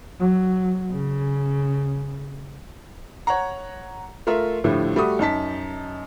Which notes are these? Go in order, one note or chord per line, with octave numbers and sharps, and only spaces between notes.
F#3
C#3
C#5 F#5 A#5
A3 F4 A#4 E5
A2 D3 F3 G3 A3
G3 A3 F#4 D#6
F#2 D#4 A5 B6